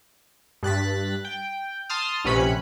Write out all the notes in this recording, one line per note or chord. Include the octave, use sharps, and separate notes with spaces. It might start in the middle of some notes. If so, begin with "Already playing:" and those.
G2 F#6 A6 B6
G5
A5 C6 D#6 F6
A#1 C3 C#4 B4 B5 C#7